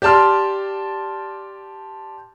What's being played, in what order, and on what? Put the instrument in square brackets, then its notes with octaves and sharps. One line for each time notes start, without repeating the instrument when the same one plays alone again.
[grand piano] G4 D5 A5 C6 F6